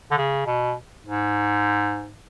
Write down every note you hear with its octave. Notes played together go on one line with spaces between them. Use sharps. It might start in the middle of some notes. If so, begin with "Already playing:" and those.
D3
C#3
B2
G#2